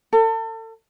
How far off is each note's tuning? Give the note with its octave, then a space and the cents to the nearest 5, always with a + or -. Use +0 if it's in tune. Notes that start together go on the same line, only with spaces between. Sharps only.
A4 +35